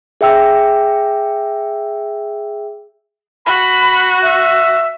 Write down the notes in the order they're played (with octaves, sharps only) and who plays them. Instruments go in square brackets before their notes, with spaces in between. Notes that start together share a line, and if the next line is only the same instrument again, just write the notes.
[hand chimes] G#4 E5 G5 E6
[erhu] F#4 [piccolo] B5
[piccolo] E5